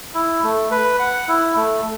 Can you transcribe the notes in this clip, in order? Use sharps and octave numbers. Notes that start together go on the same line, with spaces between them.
E4
A3
B4
F#5
E4
A3